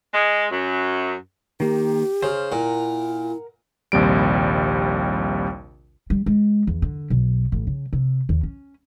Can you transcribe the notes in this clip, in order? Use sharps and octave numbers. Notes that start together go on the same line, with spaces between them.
G#3
F#2
D#3 A#3 G4
C#3 C5 F6
A#2 E4 A#4 F#5 A#5
A#1 D#2 C3 G3 D7
G3
G#3
E2
D3
B1
A1
C#3
C3
D#2
C#4